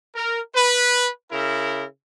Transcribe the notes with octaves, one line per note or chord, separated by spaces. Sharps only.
A#4
B4
C#3 E4 A#4